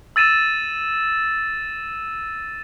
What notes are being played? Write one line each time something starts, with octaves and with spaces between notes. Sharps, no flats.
E6 A6 D#7 E7